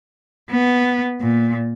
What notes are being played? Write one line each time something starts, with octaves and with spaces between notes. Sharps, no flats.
B3
A#2